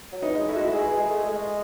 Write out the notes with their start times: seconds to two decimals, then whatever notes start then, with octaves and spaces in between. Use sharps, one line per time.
0.12 F#3
0.22 E3 D#4
0.35 G#3
0.48 A3 E4
0.56 F#4
0.61 G#3
0.64 E4
0.72 G#3 G#4
0.85 E3
0.97 G#3
1.09 A3
1.23 G#3